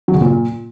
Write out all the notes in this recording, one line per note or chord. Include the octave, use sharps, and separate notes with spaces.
F#3
C#3
A#2